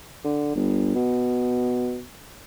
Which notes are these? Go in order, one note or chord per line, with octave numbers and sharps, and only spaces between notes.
D3
G1
B2